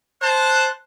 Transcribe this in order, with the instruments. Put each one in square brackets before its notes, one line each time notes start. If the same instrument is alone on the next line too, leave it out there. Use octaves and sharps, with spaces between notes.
[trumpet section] C5 A5 [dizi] F#6